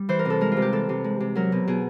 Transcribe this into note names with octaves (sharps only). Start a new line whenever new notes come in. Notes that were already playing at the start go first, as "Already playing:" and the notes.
Already playing: G3
E3 C5
A#4
C3 A4
G#3 A#4
F4
C3
G4
E3 A4
C3
G#3
C3
F#3 A#4
B2
B2 G#4